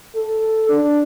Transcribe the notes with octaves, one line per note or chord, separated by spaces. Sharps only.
A4
D4